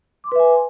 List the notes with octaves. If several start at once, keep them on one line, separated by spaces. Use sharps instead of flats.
B4 E5 G#5 C6 D6